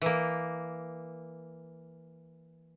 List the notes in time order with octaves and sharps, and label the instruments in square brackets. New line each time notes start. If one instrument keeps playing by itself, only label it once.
[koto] E3 A#3